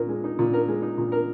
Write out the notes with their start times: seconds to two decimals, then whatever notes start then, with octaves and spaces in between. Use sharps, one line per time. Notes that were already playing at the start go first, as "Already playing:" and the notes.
Already playing: A#2 A#4
0.09 G#3
0.24 D#4
0.39 A#2
0.53 A#4
0.68 G#3
0.82 D#4
0.98 A#2
1.12 A#4